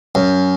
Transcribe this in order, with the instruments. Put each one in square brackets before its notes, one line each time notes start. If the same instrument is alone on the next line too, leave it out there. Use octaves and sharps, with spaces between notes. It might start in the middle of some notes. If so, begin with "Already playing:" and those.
[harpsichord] F#2